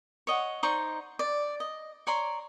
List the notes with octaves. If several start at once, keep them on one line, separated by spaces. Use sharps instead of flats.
C#5 D#5 F#5
D#4 C5 D5 C#6
D5
D#5
C#5 D5 A#5 C6